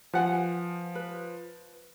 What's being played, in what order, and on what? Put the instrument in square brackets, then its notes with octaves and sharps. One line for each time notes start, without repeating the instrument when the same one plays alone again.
[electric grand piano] F3 [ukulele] B4 F#5 G#5
[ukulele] B4